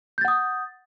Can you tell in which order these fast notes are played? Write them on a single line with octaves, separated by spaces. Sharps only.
G6 A6 F#5 D#6